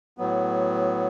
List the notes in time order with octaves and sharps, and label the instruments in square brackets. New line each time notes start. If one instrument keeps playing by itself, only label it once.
[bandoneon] A2 F#3 B3